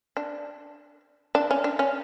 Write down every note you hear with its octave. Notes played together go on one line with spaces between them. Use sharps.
D4
D4
C#4
D4
C#4